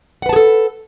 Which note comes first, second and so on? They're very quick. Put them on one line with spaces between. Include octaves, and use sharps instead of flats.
F#5 B4 A5 G#4 A4